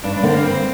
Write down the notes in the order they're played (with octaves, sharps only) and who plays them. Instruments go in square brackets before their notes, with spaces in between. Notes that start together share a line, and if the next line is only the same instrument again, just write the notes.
[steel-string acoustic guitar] G2 [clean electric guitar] D4
[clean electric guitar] D4
[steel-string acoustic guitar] D3 A#3 [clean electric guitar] C4
[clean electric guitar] A#3
[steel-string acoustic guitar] G2 [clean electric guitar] C4